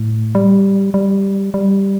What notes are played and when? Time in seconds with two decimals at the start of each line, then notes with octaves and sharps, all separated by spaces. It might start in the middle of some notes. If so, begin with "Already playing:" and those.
Already playing: A2
0.35 G3
0.94 G3
1.54 G3